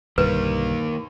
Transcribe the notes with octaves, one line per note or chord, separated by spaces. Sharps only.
B1 G2 D3 D#3 A#3 B4